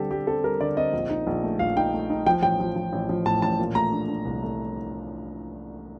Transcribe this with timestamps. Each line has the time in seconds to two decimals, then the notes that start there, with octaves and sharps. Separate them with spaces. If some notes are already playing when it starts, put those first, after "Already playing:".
Already playing: D3 G3 C4 G4 A4
0.11 G3 G4
0.27 C4 A4
0.44 G3 A#4
0.60 D3 D5
0.77 C4 D#5
0.93 A#1
1.09 D#4
1.27 A#1
1.44 A3
1.59 A#1 F5
1.76 D#4 G5
1.93 A3
2.10 D#4
2.26 F3 G5
2.42 A1 G5
2.60 F3
2.76 F3
2.93 A1
3.09 F3
3.26 A2 A5
3.42 A1 A5
3.59 A#2
3.75 A3 A#5
3.92 D4
4.08 D4
4.25 C2
4.43 A3